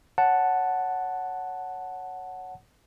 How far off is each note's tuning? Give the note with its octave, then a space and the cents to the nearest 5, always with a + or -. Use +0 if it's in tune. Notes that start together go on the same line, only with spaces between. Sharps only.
C#5 +0 F#5 +0 A5 +0